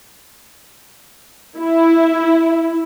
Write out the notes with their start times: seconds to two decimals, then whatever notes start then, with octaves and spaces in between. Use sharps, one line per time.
1.57 E4